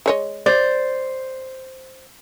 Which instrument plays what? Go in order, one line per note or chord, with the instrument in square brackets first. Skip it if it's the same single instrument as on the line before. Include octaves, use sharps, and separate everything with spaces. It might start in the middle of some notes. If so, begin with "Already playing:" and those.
[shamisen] G#3 C#5 D#5
[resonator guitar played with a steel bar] C5 [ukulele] D5